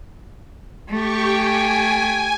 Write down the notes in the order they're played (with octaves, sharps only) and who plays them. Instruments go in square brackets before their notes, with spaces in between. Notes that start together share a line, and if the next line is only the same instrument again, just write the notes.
[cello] A3 [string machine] G4 C#6
[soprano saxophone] G5 [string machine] G#5